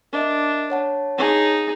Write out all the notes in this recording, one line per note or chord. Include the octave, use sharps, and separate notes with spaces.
D4 A#4 D#5 E5
C#5 F#5 A5
D#4 G#4